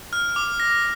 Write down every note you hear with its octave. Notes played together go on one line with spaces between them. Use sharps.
F6
D6
A#6